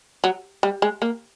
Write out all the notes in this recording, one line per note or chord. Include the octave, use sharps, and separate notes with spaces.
F#3
G3
G#3
A#3